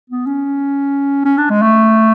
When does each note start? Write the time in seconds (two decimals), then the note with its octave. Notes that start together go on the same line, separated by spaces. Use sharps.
0.10 B3
0.26 C#4
1.25 C#4
1.38 D4
1.50 G#3
1.62 A3